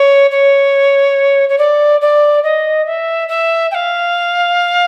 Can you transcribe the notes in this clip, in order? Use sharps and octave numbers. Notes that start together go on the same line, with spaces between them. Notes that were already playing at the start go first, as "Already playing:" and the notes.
Already playing: C#5
C#5
C#5
D5
D5
D#5
E5
E5
G5
F5